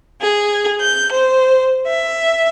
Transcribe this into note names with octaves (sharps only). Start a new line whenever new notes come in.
G#4
G6
C5
E5